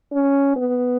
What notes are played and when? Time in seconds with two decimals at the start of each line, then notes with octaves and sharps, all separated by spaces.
0.12 C#4
0.56 B3